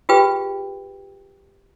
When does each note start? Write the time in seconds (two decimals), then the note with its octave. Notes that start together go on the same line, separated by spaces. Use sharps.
0.09 F4 G4 G#4 B4 G5